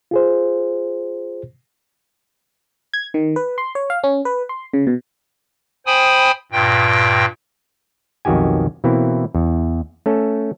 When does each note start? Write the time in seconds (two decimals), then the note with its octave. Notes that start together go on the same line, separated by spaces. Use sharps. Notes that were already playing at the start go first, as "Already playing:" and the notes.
0.11 F4 G#4 C5
2.93 G#6
3.14 D#3
3.36 B4
3.58 C6
3.75 C#5
3.90 F5
4.04 C#4
4.25 B4
4.49 C6
4.74 C#3
4.87 B2
5.86 C5 G5 G#5 B5 D#6
6.52 G2 A#2 G5
8.25 B1 F2 D#3 F#4 G4 G#5
8.84 B2 E3 A#3 C4 E4
9.35 E2
10.06 A3 C#4 A4